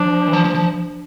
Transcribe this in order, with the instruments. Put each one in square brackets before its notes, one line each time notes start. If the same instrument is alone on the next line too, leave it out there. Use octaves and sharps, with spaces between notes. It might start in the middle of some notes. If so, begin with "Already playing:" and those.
Already playing: [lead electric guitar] F3 [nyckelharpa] D4
[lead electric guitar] E3
F3
F3
F3